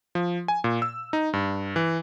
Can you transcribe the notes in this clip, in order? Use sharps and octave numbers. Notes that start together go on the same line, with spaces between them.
F3
G#5
A#2
E6
D#4
G2
E3